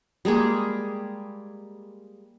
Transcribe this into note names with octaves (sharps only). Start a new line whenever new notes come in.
G3 G#3 A#3 G#4